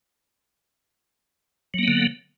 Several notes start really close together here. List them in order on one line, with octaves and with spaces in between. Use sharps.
F#3 A#3 B3 D3